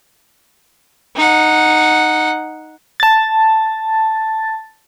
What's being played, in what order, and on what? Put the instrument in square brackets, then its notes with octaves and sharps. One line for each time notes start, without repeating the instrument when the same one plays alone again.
[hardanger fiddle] D#4 F#5
[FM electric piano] A5 A6